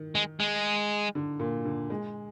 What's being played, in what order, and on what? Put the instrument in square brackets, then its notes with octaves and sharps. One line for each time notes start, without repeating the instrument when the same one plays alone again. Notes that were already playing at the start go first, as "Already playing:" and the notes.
Already playing: [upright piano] D#3
[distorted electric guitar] G#3
G#3
[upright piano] D3
A#2
D3
G#3